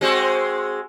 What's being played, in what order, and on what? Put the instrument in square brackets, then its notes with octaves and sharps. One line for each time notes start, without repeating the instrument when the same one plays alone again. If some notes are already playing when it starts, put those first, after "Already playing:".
[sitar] G#3 C4 F#4